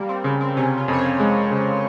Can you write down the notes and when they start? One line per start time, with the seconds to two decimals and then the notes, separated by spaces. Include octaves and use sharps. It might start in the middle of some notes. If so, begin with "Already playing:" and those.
Already playing: G3 A#3
0.09 C4
0.24 C#3 C4
0.41 C4
0.57 C3 C#4
0.77 F4
0.88 F2
0.93 C#5
0.99 C5
1.20 G#3
1.51 C#3